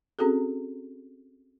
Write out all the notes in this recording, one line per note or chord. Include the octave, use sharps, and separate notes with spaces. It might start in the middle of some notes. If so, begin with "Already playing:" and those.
C4 C#4 F#4 G#4 A4